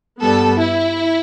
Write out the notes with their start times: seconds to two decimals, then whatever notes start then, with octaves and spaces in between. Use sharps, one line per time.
0.21 G2 G3 B3 A4
0.60 E4